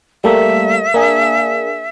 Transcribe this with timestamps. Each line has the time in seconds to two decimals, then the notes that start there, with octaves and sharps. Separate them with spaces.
0.24 G3 A3 A#3 E5
0.94 A#3 D4 G#4